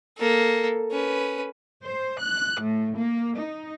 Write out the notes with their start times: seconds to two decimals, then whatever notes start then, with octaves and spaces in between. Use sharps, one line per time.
0.18 A#3 A4
0.91 C#4 B4
1.84 C5
2.21 F#6
2.61 A2
2.96 A#3
3.40 D#4